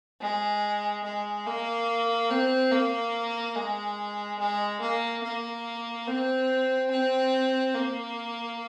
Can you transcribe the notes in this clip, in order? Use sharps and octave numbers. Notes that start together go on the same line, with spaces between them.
G#3
G#3
A#3
C4
A#3
G#3
G#3
A#3
A#3
C4
C4
A#3